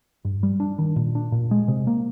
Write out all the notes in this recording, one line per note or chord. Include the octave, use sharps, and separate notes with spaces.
G2
G3
D4
D#3
A#2
D4
A#2
G#3
C3
A#3